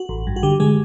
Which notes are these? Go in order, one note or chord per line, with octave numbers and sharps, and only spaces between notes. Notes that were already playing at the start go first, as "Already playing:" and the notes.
Already playing: F#4
A1
G2
F#4
D3 G4
D3 G#3 G#4